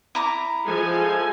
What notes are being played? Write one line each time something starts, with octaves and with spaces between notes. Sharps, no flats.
E4 A#5 D6
F3 G#3 A4 G#5